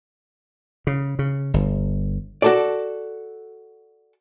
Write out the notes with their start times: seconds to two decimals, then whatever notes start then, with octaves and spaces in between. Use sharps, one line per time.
0.87 C#3
1.19 C#3
1.54 G1
2.42 F#4 A4 D5